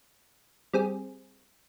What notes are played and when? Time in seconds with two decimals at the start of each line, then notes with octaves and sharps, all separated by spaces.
0.74 G3 C4 G#4